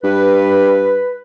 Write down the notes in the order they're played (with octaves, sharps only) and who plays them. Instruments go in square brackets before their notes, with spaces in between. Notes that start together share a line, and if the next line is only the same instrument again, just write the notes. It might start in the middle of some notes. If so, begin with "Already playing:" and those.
[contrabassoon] G2 [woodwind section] B4